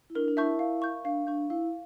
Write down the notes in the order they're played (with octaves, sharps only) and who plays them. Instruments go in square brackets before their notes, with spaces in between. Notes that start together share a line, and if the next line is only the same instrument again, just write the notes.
[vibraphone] E4
[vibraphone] D4 [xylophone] A#4
[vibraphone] D4
[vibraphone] E4 [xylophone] E5 A5 C#6 G6
[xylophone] F5
C#6 G6
[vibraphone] D4 [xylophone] F5
[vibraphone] D4 [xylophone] C#6 G6
[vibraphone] E4 [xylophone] F5